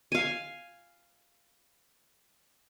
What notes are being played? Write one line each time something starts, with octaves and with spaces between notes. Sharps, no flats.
F5 G#5